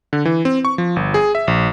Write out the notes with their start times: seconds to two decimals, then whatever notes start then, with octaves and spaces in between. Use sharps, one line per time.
0.13 D3
0.25 E3
0.45 C4
0.65 C#6
0.78 F3
0.96 G1
1.14 G#4
1.35 E5
1.47 A#1